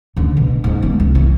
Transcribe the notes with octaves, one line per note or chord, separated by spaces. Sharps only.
D2 D3
B2
G#2 G#3
A3 B3
C2
E3